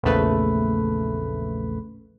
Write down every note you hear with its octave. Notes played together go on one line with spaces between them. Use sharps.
A#1 E2 C#3 A3 B4